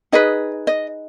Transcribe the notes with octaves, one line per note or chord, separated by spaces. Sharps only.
D#4 G#4 B4 D#5
D#5